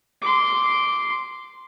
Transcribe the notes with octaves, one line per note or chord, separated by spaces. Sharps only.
C6 D6